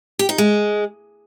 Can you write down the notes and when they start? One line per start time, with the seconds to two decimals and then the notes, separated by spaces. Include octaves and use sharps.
0.19 G4
0.29 D#4
0.38 G#3